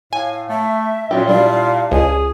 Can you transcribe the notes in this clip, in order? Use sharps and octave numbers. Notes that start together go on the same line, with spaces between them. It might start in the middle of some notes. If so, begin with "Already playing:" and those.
A2 F5 G#5
A3 E5
A#2 C#4 F#4 G4
G3 D4 E4 F5
C#2 G#4 G#5